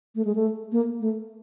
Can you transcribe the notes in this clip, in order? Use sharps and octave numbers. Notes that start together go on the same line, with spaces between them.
A3
G#3
A3
A#3
A3